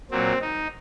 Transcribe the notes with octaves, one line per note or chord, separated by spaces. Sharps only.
A#2 F#3 C4
D#4